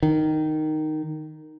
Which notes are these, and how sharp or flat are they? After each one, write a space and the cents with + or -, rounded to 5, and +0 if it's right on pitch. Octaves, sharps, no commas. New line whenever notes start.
D#3 -5